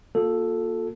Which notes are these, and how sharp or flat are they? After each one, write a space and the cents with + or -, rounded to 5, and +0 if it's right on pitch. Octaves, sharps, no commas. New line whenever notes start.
A#3 +10 F4 +40 A4 +0